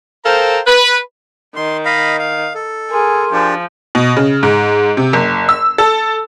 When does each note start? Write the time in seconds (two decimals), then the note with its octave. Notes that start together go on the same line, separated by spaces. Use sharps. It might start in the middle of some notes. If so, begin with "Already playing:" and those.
0.25 A4 A#4 C5 F5 G5 A#5
0.67 B4
1.56 D#3 C6
1.85 D#5 F5 B5
2.19 F5
2.55 A4
2.90 G#4 A#4 G#5 C6
3.32 F3 D4 G4
3.95 B2
4.17 C#3
4.43 G#2
4.97 C3
5.13 F#1
5.49 E6
5.78 A4